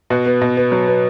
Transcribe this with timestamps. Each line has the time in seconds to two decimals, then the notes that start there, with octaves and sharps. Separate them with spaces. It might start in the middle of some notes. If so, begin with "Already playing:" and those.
0.10 B2 F#4
0.26 B3
0.42 B2
0.57 B3
0.72 F#3
0.88 B3